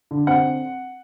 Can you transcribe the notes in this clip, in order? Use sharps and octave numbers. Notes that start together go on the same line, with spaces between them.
D3
C4 F#5